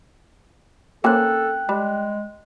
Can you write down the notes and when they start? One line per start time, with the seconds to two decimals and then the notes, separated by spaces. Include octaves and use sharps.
1.04 A#3 C4 C#4 A4 G5 F#6
1.69 G3 G#3